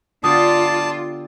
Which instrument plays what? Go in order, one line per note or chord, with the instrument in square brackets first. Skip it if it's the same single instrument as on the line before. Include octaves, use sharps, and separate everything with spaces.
[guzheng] D3 B3 G4 [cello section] F4 [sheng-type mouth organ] D5 A5 [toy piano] D#6